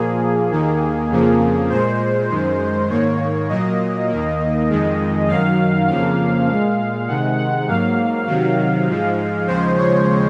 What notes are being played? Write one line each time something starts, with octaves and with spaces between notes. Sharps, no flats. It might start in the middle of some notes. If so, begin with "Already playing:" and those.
Already playing: A#2 F3 A#3 G#4
D#2 D#3 A#3
F2 C#3 F3 A#3
A#2 G#3 C5
F#2 D#3 G#3
G#2 D#3 A#3 C#5
A#2 F#3 A#3 D#5
D#2 D#3 A#3
F2 D#3 G#3
F#2 D#3 F#3 F5
F2 C#3 F3 A#3 F5
A#2 G#3 F5
C3 D#3 G#3 F#5
F#5
G#2 F#3 A#3 F5
C3 D#3 F#3
G#2 F3 G#3
D#2 C#3 F3 G#3 C5
C#5